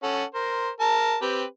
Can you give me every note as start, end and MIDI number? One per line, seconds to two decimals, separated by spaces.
0.03 0.24 61
0.03 0.24 69
0.03 0.24 78
0.35 0.69 70
0.35 0.69 72
0.80 1.16 70
0.80 1.16 81
1.22 1.44 60
1.22 1.44 67
1.22 1.44 71